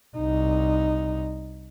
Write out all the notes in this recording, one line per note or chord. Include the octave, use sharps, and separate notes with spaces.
C2 D#4